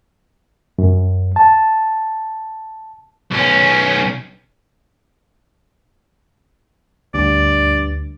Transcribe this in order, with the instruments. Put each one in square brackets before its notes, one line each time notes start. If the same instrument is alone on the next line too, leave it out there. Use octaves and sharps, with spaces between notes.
[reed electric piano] F#2
A5
[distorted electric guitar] B1 C#4
[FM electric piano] D2 [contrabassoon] G2 [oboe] D5